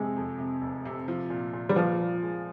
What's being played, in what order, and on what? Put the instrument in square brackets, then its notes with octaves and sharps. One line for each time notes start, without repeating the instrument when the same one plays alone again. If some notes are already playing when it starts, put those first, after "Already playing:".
Already playing: [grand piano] F2 C3 [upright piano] G#3
[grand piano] F2
C3
F1
C3
F3
A#2
A#2
[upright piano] G3
[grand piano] A#2 [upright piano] F3
[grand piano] A#2
G#3